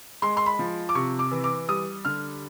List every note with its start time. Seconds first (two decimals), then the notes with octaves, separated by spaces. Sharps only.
0.22 G#3 C6
0.37 C6
0.46 B5
0.59 F3
0.89 D6
0.95 C3 C#6
1.19 D6
1.31 E3
1.44 D6
1.68 G3 D#6
2.05 D3 F6